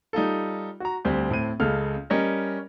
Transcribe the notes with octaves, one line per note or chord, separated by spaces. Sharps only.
G3 D#4 F4 A4
F#4 A#5
D2 G3 C4
A2 C4 D#7
C#2 C#3 A4 F6
G3 C#4 A#4 D#5